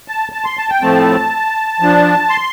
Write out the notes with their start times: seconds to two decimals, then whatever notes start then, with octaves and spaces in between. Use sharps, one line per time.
0.08 A5
0.32 A5
0.45 C6
0.57 A5
0.70 G5
0.81 A2 F3 A3 C4 A5
1.80 F3 D4
2.30 C6